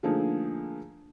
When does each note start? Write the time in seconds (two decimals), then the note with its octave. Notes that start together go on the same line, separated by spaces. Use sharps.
0.03 D3 F3 A3 A#3 D#4 G#4